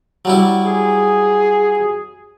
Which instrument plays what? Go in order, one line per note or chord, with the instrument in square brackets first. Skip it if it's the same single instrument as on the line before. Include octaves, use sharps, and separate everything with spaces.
[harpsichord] F#3 G3 E4
[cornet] G#4